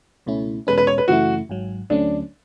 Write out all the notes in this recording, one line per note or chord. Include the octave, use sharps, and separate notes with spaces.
C#2 B2 A3 C#4 E4
E2 B2 G#3 C#4 B4
B4
C#5
B4
F#2 C#3 E3 A3 E4 F#4
G#1 G#2 F#3
D2 D3 F#3 A3 C#4 D4